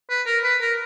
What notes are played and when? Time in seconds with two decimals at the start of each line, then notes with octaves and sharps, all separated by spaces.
0.09 B4
0.27 A#4
0.44 B4
0.61 A#4